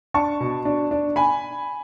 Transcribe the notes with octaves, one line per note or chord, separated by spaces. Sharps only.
D4 A5 C#6
B2
D4
D4
G#5 B5